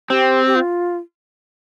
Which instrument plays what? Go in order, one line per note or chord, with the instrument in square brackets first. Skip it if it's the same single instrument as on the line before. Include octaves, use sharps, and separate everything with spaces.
[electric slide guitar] C4 [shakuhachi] G4
[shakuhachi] G4
F4